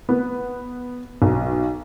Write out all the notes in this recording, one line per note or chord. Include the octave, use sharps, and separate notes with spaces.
B3
B1